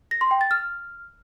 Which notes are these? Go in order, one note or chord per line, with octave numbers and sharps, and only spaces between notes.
A#6
C6
G5
A6
F6